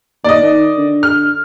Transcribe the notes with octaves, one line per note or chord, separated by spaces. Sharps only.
D#2 D5 D#5
D#3
D3
F6